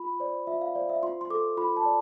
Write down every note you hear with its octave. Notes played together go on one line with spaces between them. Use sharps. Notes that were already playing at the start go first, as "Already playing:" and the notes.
Already playing: F4 B5
C5 D5
F4 E5
F5
C5 D5
E5
F4 C6
C6
A4 D6
F4 B5
A5
D5